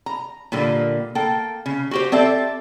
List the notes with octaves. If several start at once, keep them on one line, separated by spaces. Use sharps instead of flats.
A#5
A#2 D3 G3 A#3
A#3 A4 G5
C#3
F#4 G4 C5
C4 A4 D5 E5